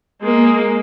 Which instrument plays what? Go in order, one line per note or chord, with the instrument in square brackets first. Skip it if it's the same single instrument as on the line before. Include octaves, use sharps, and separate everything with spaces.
[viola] G#3 A#3